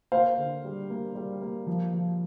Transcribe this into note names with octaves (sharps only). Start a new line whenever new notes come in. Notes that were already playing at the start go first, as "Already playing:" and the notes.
A#3 C5 F5
D3
G3
A#3
G3
A#3
F3
F3